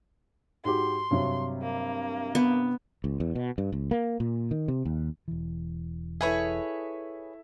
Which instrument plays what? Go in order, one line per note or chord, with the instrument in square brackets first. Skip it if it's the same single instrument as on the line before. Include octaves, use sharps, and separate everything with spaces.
[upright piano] G#2 F#4 G4 [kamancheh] C6
[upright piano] G2 C3 F#3
[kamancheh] A#3
[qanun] B3
[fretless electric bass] C#2
E2
B2
G2
C#2
A#3
A#2
D#3
C3
D#2
[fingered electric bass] E1 E3
[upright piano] E4 A4 E5 [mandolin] G#4 B4 C#5